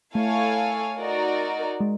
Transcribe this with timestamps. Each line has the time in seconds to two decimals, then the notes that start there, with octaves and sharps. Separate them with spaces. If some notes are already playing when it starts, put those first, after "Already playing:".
0.15 A3 E4 A4 C#5 F5 G#5
0.98 D#4 F#4 A#4 D5
1.80 G#3